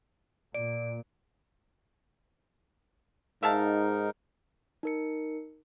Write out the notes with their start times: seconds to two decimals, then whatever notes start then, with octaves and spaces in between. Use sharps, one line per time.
0.54 A#2 D5 D7
3.43 G#2 D#4 A#4 E5 F5 A5
4.83 D#4 A#4 C#7